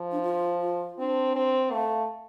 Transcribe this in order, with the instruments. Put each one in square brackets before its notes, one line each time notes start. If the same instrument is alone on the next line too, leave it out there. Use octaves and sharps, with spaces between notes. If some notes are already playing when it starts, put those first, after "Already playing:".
Already playing: [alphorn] F3
[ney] D4
F4
F4
[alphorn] C4 [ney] D4
[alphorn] C4
[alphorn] A3 [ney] F5